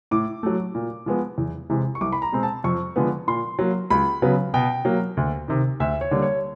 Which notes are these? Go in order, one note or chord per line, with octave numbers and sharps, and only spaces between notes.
A2 D6
F#3 A3
A#2
F3 G#3 B3
E2
C3 E3 G#3
C#6
C2 D6
B5
A#5
B2 G#3 C4
A5
F2 C#6
D3 F3 G#3 B3
A#2 C6
F#3 A#3
C#2 B5
C#3 F#3 B3
B2 G5
F#3 A#3
D2
C3 D#3
D2 E5
C#5
D3 G3 A#3
C#5